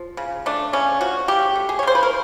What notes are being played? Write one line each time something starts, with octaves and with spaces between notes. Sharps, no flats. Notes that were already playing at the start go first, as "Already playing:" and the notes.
Already playing: F3
C#3
A3 D4
C#3 C#4
F3 F#4
C#3 G4
A3
G#4
C#5
C#3 C5
B4
A#4